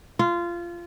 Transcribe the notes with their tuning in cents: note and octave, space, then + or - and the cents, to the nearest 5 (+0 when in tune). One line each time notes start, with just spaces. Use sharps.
F4 -20